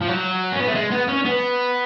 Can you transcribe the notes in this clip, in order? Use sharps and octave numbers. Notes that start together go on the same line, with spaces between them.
F3
F#3
C#4
B3
A3
G#3
B3
C#4
B3